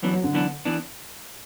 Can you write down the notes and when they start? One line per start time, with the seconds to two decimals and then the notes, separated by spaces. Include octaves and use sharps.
0.03 F#2 E3 F#3 B3 D4
0.13 F#3
0.23 D3
0.33 F#2 E3 B3 D4
0.65 E3 B3 D4